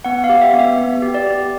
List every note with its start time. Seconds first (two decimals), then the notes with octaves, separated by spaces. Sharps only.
0.05 B3 F#5
0.24 F5
0.29 G4
0.41 E5
0.53 B3
0.59 E5
0.78 B3
1.02 G4
1.14 D5
1.26 G4